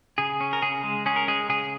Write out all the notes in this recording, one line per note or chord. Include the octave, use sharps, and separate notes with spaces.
C#3 G#4
C#4
A#4
C#3 G#4
G#3
C#4 G#4
A#4
G#3 G#4
C#3 G#4